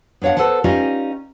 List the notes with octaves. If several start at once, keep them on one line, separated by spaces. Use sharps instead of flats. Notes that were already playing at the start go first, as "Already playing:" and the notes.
B3 D4 C#5 F5 F#5
A4 B4 C5 F#5 A5
C#4 D#4 F4 G4 D5 D#5